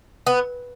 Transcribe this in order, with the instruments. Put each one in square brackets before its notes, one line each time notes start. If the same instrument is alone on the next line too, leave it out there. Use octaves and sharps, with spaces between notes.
[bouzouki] B3